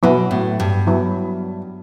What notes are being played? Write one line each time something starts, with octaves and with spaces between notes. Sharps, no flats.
B2 F#3 B3 E4
A2
G2
F#3 B3 E4